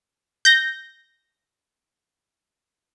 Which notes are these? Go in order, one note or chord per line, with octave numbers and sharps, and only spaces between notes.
G6 A#6